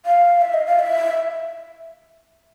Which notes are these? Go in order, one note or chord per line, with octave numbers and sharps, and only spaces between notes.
F5
E5
D#5
F5
E5